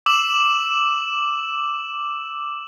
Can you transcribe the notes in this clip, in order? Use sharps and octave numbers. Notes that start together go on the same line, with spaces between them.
D6 E6 E7 F#7